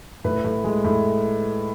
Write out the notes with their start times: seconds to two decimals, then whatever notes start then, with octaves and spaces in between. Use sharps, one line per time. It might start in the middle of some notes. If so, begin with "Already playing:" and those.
0.24 A2 B4
0.44 A2
0.64 G#3
0.84 A2